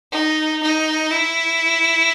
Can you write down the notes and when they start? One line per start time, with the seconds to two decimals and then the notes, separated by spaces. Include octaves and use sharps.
0.12 D#4
0.62 D#4
1.11 E4